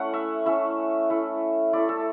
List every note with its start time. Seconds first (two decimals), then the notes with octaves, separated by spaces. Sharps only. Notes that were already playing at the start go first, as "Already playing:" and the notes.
Already playing: A3 C#4 E4 F#5
0.13 E5
0.46 A3 C#4 E4 E5
1.10 A3 E4
1.73 A3 E4 D5
1.89 A4